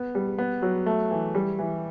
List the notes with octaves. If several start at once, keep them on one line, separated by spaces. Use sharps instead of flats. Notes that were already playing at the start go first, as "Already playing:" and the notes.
Already playing: B3
G3
B3
F#3
A3
E3
G3
E3